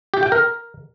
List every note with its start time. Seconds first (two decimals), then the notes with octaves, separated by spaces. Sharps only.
0.14 G4
0.23 G5
0.32 A#4